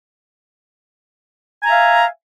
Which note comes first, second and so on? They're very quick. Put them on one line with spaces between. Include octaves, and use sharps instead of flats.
G#5 A#5 E5 F5